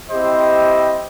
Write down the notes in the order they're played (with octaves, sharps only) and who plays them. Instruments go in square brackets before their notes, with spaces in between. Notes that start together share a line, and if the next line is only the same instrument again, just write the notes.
[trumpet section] C4 E4 G4 C5 D#5